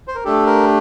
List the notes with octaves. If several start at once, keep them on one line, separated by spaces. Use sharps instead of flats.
C5
A#4
A3 D4 G4 A4
A#4